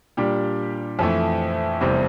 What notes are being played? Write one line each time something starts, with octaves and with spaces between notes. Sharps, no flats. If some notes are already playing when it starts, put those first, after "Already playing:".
A#2 G3 D4 G4
F2 E3 A3
F1 E2 C3 G3 C4